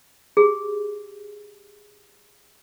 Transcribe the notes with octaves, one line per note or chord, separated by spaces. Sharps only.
G4 G#4